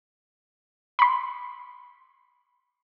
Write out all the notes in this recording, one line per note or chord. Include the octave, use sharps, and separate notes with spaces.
B5 C6